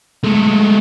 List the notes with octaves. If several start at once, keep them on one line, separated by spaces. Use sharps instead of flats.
G#3 A3